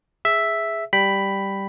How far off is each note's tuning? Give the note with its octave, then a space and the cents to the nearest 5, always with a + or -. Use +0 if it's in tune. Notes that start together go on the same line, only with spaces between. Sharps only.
G#4 +0 E5 +0
G3 +0 G5 -5 B5 +0